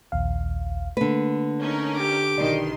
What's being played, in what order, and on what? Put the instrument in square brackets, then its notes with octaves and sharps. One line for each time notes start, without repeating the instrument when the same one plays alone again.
[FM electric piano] A#1 D#2 F5
[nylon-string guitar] D3 B4 [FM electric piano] A3 A#3
[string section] C#4 D#4 A#4
[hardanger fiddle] G4 D6
[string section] B1 D#3 C6 [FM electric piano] D5